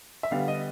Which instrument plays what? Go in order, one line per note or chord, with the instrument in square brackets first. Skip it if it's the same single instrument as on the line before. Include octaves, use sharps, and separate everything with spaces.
[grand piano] E5
[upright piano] D3 G3 B3 [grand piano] F5
[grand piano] D#5